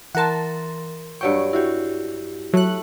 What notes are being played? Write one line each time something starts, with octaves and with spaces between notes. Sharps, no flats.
E3 A#4 F#5 A5 C6
G2 F#3 G5 C#6
E4 F#4 G4
F#3 A3 F#6